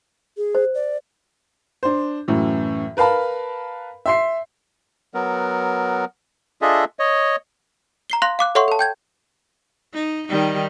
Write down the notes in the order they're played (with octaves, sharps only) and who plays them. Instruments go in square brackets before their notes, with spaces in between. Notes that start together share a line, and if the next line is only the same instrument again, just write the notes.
[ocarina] G#4
[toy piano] C5
[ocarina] D5
[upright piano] D4 C5
F#2 A2 E3
A#4 B4 F5 A5 B5
E5 C6 C7
[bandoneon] F#3 B3 A#4
D4 F4 G#4 A4 D#5 E5
C#5 D#5
[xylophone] A#5 C7 G7
F5 C6 F#6 A#6 F7
F5 D6 F#6
A4 C#5 E5 F#5 C6 C#6
A4 A5
G5 G6 G#6
[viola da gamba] D#4
D#3 G3 D#4